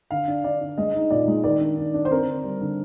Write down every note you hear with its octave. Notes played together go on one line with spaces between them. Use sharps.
D3 F5
D4
D3 D5
D4
G#3 D#5
D#4
A#2 D5
G#3
D#3 D5
D4
D4
D4
C5
C4 A#4
D3
G3
D3